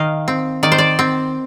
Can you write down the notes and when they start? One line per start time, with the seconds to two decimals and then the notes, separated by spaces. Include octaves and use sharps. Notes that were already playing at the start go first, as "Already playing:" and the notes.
Already playing: D#3 D#5 F5
0.28 C4
0.63 D#3 D5
0.72 C5
0.78 D5
0.99 C4